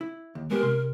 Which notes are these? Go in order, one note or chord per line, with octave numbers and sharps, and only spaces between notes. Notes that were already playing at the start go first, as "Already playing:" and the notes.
E4
D#2
G#3 B3 G4 A#4
C3 C6